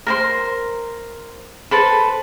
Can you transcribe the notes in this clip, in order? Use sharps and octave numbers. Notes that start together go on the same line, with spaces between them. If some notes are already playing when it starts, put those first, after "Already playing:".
A#4 C5 C6
A4 B4 C5